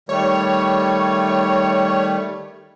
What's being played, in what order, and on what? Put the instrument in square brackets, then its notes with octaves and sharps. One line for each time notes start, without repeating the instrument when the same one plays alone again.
[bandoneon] D#3 G3 A3 [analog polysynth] C#5